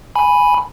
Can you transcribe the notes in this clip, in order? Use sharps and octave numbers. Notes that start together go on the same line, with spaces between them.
G#5 B5